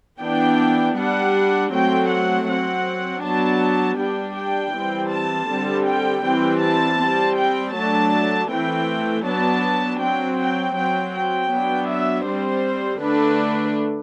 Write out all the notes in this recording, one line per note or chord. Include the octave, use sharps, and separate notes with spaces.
E3 B3 D4 G5
G3 D4 F#5
F#3 A3 C4 G5
F#5
F#3 C4 F#5
F#3 B3 D4 A5
G3 D4 G5
G5
E3 G3 C4
A5
D3 G3 C4
G5
E3 G3 C4 G5
A5
G3 C4
G5
F#3 A3 D4 A5
E3 A3 C4 G5
F#3 B3 D4 A5
F#3 C4 G5
G5
F#3 C4 G5
G5
F#3 B3 D4
E5
G3 C4 C5
D3 A3 D4 B4